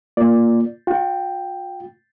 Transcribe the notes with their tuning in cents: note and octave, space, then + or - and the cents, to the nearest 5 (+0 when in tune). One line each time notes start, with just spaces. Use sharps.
A#3 -5 F4 +0 D5 +0
F4 +45 G5 +0